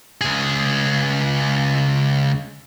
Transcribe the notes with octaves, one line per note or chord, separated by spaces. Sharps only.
C#2 G#4